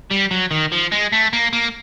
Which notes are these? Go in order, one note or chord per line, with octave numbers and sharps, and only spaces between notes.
G3
F#3
D#3
F3
G#3
A3
A#3
A#3